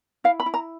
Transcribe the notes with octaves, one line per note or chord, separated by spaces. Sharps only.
E4 F5
B5
E4
A#5